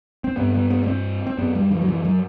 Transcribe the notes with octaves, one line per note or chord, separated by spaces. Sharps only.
C4
G2 B3
B3
B3
B3
C4
C4
F#2 B3
G3
E3
F#3
E3
F#3